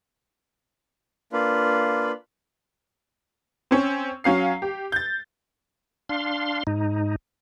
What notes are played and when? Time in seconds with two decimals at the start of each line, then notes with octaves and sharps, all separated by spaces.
1.33 A#3 D4 F4 B4
3.71 C4 C#4
4.24 F#3 C#4 F5 C7
4.62 G4
4.92 G6 A6
6.09 D4 F5 C6
6.67 G#2 D#4